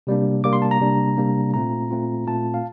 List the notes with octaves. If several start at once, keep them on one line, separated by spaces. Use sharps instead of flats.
C3 G3 A#3 D4
C3 G3 A#3 D4 D6
C6
A5
A#5
C3 G3 A#3 D4
C3 G3 A#3 D4
A#2 A3 C4 F4 A#5
A#2 A3 C4 F4
A#2 A3 C4 F4 A5
F5